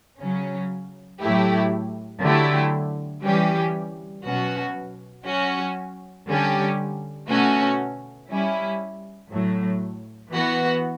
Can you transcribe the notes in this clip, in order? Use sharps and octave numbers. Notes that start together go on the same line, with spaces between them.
C#3 F#3 C#4
A2 F#3 A3 E4 G4
D3 F#3 A3 E4 G4
E3 G3 C#4 G4
B2 F#3 C#4 F#4
F#3 C#4 F#4
D3 G3 C#4 G4
B2 A3 C#4 F#4
G3 C#4 E4
A2 F#3 A3
E3 B3 F#4